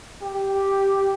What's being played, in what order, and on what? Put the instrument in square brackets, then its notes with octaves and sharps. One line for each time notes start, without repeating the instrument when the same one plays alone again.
[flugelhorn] G4